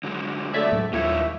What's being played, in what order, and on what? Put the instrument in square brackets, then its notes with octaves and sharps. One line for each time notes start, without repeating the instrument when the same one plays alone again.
[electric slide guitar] D3 F#3 G#3
[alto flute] A3 [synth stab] C#5 D5 E5
[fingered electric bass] A2 F#3 A#3
[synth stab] A#1 C#5 [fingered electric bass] D#2 [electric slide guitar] G3 E4 F4 [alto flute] E5